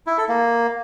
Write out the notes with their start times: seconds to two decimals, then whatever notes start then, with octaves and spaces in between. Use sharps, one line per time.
0.07 E4
0.18 A4
0.29 A#3